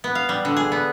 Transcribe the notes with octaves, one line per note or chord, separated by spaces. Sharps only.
B3
F5
G3
D3
G#4
B3